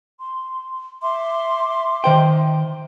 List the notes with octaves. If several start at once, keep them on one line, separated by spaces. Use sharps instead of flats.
C6
E5 C6 D6
D#3 C5 G5